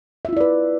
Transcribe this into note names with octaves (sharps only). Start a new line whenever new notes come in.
E4 F4 B4 D5 E5